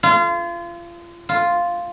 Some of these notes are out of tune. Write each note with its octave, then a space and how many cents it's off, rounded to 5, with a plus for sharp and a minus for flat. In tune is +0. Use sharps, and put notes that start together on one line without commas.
F4 -30
F4 +0